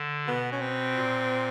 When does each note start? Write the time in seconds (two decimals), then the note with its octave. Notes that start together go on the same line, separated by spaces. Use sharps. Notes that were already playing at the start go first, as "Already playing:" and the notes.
Already playing: D3
0.27 B2 B3
0.52 C#4
0.61 C4
0.95 A#2